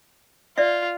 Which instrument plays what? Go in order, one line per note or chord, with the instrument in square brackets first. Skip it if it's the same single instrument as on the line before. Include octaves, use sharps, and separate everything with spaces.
[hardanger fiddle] F4 [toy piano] D5 E5